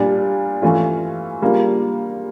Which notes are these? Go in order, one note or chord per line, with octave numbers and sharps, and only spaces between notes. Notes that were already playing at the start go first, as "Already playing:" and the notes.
Already playing: A#2 G3 D4 F4
E3 A3 C#4 F4
C#3 G3 A#3 D4 F4